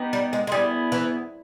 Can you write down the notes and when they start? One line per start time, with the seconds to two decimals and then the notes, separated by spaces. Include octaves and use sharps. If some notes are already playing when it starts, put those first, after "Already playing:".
Already playing: B3 D#4 G4
0.13 G3
0.33 G#3
0.47 G#3
0.52 G3 B3 E4 G#4
0.92 E3